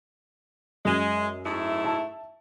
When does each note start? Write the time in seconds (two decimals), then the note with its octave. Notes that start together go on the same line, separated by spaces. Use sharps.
0.85 F#2 G#3
1.44 G#2 A3 E4
1.85 E5 A5